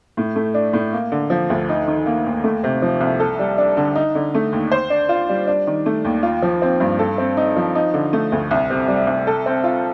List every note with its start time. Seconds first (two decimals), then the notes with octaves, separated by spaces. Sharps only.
0.17 A2
0.36 A3
0.54 D4
0.73 A2
0.93 A#3
1.12 D3
1.30 F3
1.50 D2
1.69 D#4
1.87 D#3
2.06 A#3
2.26 D#2
2.44 A3
2.64 C3
2.82 F3
3.01 C2
3.20 A4
3.39 G3
3.58 D4
3.77 D3
3.95 D#4
4.15 D3
4.34 A3
4.52 D#2
4.72 C5
4.90 D4
5.09 F4
5.29 G3
5.47 D4
5.67 D#3
5.86 A3
6.05 D#2
6.23 F4
6.42 F3
6.62 C4
6.80 G2
6.99 A4
7.18 C4
7.37 D#4
7.57 F3
7.75 D#4
7.94 D3
8.13 A3
8.32 D2
8.51 C2
8.70 C3
8.88 G3
9.07 C2
9.27 A4
9.46 C4
9.64 F4